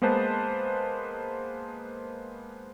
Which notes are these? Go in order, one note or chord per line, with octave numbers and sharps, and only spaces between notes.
G#3 A#3 B3 B4 C5 A5